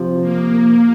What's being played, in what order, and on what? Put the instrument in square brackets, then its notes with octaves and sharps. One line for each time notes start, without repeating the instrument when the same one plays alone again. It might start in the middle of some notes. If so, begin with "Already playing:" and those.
Already playing: [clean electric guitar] C3 F3
[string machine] A#3